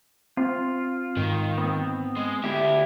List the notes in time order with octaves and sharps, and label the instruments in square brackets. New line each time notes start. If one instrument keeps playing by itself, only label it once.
[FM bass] C4 [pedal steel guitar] F4
[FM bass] G#2 [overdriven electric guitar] D#3
[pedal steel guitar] B3 C4
[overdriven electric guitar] G#3
[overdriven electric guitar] D2 E5 [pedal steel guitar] E4 G4